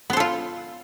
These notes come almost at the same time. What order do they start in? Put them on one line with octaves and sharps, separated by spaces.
B3 C5 A4 F4